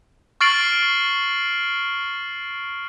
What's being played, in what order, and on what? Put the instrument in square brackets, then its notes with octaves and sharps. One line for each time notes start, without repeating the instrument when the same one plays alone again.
[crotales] C#6 F6 A6 C7 D7 F#7